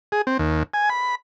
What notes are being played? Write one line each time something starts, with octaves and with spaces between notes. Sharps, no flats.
G#4
C4
D#2
G#5
B5